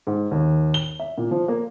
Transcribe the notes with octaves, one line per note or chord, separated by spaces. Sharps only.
G#2
D#2
G7
E5
A#2
F3
A#3